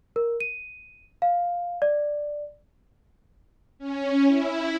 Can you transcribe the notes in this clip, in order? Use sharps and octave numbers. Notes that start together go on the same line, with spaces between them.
A#4
D#7
F5
D5
C#4
E4